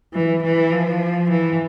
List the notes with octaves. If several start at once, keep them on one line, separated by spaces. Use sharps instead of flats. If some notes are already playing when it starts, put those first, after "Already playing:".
E3
E3
F3
E3